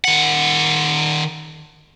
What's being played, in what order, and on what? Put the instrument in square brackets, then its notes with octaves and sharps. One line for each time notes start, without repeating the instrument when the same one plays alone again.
[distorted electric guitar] D#3 F#5